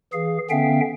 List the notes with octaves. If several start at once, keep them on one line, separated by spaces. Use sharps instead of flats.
E3 G#4 F5
D3 B3 C#4 E5 F5 G5